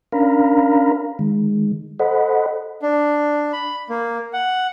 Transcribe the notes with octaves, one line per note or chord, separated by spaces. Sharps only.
C#4 D4 A#4 F5 A#5 B5
D#3 G#3
A4 C5 D#5 F#5 B5
D4
B5
A#3
F#5